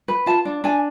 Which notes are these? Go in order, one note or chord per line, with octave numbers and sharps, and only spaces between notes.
B4
F4 A5
D4
D4 G#5